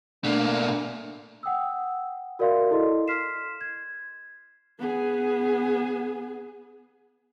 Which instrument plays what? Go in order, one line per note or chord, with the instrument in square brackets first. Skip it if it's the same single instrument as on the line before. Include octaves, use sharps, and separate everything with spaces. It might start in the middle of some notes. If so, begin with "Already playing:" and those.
[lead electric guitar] B2 A#3 [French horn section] A3 D4
[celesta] F#5 G5 D#6 E6
F#4 A#4 D5 E5 F5 C6
E4 A4 D#5 C6
C6 F6 B6 C7 E7
G#6
[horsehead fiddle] B3 G#4